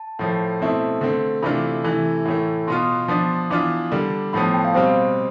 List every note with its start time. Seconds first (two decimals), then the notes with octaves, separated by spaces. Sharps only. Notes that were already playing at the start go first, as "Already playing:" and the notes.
Already playing: A5
0.19 A2 F3 A3
0.60 B2 A3 C4 E4 A5
1.01 D3 A3 C4
1.43 C3 E3 A3 D4 F4 B5
1.84 C3 E3 A3
2.25 A2 E3 A3
2.67 B2 B3 F4 C6
3.08 F3 B3 D4
3.50 E3 B3 D4 F4 D6
3.91 D3 G3 D4
4.33 A2 F3 B3 B5
4.43 A5
4.54 G5
4.65 F5
4.74 B2 G3 C4 C5